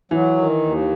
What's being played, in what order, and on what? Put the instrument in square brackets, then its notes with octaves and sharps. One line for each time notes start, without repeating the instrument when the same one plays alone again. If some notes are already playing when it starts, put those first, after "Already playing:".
[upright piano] E3 [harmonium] F#3
[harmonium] D#3
D#2